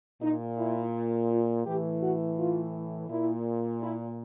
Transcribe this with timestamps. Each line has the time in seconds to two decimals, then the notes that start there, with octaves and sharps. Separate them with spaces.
0.22 A#2 D#4
0.58 E4
1.30 F4
1.66 A2 E3 G4
2.02 F#4
2.38 F4
3.09 A#2 E4
3.81 E4